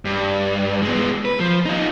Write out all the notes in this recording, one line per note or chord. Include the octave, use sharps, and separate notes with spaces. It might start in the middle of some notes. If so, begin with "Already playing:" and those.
G2
G#3 B3
B4
F3
D#4 F4